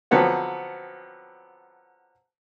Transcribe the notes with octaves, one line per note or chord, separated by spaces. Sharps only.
D3 F3 F#3 B3 C4